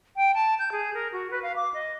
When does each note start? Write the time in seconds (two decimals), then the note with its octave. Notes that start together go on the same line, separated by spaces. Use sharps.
0.16 G5
0.34 A5
0.59 G6
0.72 G#4
0.94 A#4
1.12 F#4
1.31 B4
1.42 F5
1.56 D6
1.74 D#5